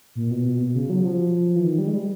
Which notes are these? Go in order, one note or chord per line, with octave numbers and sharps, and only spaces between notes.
A#2
B2
B2
B2
C#3
F#3
F#3
F3
E3
D#3
G3
G#3
G3